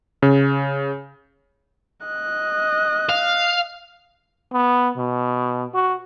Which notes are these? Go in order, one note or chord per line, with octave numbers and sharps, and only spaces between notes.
C#3
D#5 F#6
F5
B3
B2
F#4